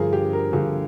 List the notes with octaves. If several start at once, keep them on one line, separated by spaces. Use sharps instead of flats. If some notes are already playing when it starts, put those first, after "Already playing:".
Already playing: G2 D3 F3 G#4 A#4
G4
A#4
G2 D3 F3 G#4